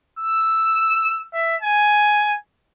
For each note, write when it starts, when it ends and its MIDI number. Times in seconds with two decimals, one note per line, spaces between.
0.19 1.26 88
1.34 1.56 76
1.62 2.34 80